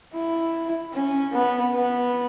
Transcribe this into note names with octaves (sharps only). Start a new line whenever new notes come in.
E4
C#4
B3
B3